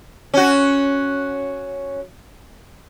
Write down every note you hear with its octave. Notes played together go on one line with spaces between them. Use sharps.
C#4 F#4